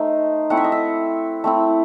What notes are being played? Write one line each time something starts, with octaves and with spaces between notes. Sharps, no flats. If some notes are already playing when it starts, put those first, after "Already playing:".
Already playing: A3 D#4 C5
A3 C4 E4 F#5
E5
D#5
E5
A3 C4 E4